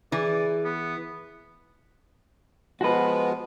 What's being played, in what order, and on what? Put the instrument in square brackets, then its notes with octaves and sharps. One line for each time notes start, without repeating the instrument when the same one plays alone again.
[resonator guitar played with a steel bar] E3 [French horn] G#4 [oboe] D5
[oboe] B3
[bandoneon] F3 G#3 B3 [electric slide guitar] F#4 B4